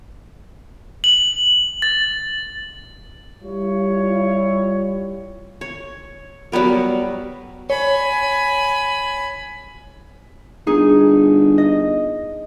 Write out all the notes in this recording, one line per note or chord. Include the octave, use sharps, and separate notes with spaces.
F#7
A6
G3 E4 F4 C#5
C#5
F#3 G3 B3 A#4
C#5 G#5 B5
G1 D#4 G#4
D#5